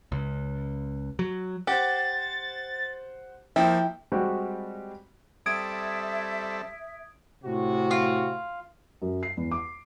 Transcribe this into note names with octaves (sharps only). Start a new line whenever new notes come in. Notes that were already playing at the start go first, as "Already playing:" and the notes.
C#2
F#3
G4 C5 F#5 A6
F3 A#3 E4 G5
G3 G#3 C4 F#4 G4
G3 C4 A4 E5 D#6 G#6 D7
A2 C3 F#4
F4
F#2
C7
E2
D6